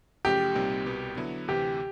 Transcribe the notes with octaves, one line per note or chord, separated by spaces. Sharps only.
F#2 C#3 F3 A3 G4
C2 A#2 G3 C4 D#4
C2 B2 G3 B3
D3 F#3 B3 E4
D2 C3 E3 G4